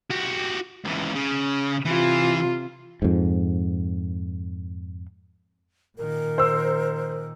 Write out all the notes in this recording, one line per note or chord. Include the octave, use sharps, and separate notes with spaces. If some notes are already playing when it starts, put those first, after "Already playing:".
F#4 G4
C#2 E3
C#3
C3 E3 F4
F2 G#2
A#2 D#3 A#4
C5 E6